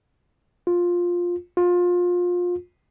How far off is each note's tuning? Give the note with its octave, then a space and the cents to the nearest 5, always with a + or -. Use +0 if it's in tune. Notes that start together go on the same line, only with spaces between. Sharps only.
F4 +10
F4 +25